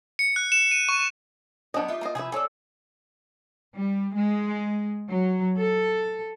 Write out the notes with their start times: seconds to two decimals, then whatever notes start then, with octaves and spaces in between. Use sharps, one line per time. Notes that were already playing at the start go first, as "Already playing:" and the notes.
0.19 C#7
0.36 F#6
0.52 E7
0.71 D#7
0.89 C#6
1.74 F#3 B3 C#4 D4 G4 D#5
1.88 D#4 F4 E5
2.01 A#3 D#5 A#5 C6
2.15 C3 F3 C#4 E4 G#4 B4 E5
2.32 C4 G#4 A4 C#5 D5 E5 E6
3.76 G3
4.16 G#3
5.09 F#3
5.57 A4